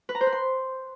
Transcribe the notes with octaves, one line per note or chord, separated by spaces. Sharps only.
B4
A#5
C5
B4
C6